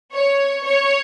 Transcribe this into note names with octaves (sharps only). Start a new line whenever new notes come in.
C#5
C#5